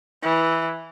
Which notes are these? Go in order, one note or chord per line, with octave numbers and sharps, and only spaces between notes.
E3